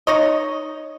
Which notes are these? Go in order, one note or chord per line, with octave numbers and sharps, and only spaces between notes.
D#4 C#5 D#5